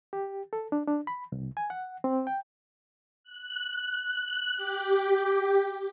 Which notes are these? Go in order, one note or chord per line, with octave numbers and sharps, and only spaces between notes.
G4
A4
D4
D4
B5
C2
G#5
F#5
C4
G5
F#6
G4